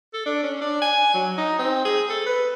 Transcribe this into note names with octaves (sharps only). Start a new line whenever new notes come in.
A4
D4
C#4
D4
G#5
F#3
D#4
C4
G#4
A4
B4